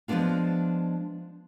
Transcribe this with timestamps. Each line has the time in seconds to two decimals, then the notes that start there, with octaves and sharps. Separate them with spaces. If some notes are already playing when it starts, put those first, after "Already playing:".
0.08 F3 G#3 A3 B3 D4 F4